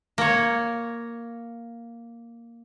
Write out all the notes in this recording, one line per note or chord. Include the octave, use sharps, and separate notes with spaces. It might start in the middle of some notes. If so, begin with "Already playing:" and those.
A#3 C#5